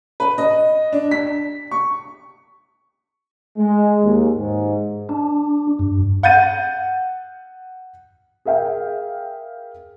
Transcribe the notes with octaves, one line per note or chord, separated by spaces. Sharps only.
B4
D#5
D4
B6
C#6
G#3
D#2
G#2
D4
G2
F#5 G6 A6 D#7
G#4 A#4 E5 F5 G5